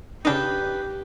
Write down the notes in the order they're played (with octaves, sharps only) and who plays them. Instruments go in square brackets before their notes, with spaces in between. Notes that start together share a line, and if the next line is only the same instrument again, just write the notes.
[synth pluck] C#3 D4 D#4 [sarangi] G4 [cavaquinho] B4 G5